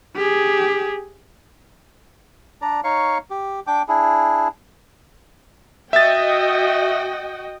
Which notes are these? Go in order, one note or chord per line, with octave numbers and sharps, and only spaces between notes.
G4 G#4
D4 D5 A#5
D#4 C#5 F5 C#6
G4
D4 G5 D6
D4 E4 G#4
F#4 D#5 E5 G5 A6